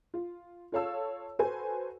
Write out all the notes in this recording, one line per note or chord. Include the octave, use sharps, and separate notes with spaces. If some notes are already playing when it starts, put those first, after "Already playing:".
F4
F4 A4 C#5 F5 A5 E6
F#4 A4 B4 C5 G#5